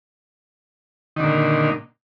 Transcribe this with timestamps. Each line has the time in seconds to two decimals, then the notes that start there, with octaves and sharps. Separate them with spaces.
1.16 D#3
1.20 D3
1.24 A#2